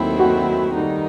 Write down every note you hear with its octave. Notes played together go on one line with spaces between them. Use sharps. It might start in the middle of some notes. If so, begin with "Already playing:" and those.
Already playing: D#2 D#3 F#3 A3 C4 E4
F#4
D#3 G3 D#4